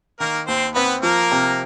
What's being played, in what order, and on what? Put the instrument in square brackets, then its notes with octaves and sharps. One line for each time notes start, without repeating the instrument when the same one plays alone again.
[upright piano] D#3 [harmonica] A#3 A#4
[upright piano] D#2 [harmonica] C4 C5
[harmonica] B3 B4 [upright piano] C4
[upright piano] F3 [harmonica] A#3 A#4
[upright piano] C3